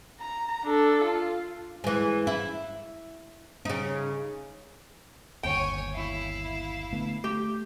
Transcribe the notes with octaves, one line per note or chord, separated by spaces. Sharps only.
A#5
D4 A4
F4
E3 G#3
E4
C#3 D#4
G1 D#2 C#5 G5 G#5
E4 F5
D3 A3 B3
A3 G4